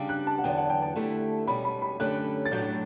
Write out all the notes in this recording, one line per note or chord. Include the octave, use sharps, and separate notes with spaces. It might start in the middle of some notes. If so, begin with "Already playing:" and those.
Already playing: C#3 G3 D4 G4
F#6
A5
F#5
E2 D3 F#3 B3 G5
F#5
G5
A5
D3 A3 E4 G4
B2 G3 C#4 B5
B5
B5
F#2 D3 A3 C#4 G4 F#6
A6
A2 F#3 A3 D4 G6